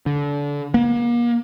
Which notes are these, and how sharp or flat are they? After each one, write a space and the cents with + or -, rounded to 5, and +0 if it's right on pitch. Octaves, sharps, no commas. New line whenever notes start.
D3 -25
A#3 +35